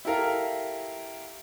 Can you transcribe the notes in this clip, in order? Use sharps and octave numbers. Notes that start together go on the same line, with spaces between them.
E4 G4 A4 A#4 F5